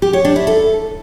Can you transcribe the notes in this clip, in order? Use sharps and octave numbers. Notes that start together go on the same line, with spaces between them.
G4
C#5
D4
E4
A4